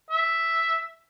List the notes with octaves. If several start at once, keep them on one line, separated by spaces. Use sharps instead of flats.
E5